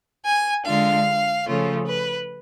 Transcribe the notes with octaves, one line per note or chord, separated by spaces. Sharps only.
G#5
D3 G#3 D4 F4 F5
C#3 F3 A3 C#4 F4
B4